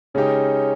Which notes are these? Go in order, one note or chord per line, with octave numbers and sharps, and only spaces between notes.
C#3 G#3 C#4 D#4 G4